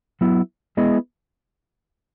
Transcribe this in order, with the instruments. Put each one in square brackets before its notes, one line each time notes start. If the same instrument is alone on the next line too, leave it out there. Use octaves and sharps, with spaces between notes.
[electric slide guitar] F#3 B3 E4
G#3 B3 E4 G#4 D#5